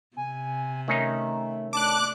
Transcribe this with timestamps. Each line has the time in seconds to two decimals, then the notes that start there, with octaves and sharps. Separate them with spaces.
0.17 C3 G#5
0.88 D#3 A3 C#4 D#4
1.73 A3 D4 A5 D6 F#6